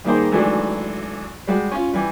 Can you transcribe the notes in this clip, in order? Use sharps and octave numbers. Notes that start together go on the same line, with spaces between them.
D#3 G3 A#3 D#4 G#4 C5
G#1 E3 F#3 A3 D4
G3 G#3 F#4
C#4 F4
E3 G3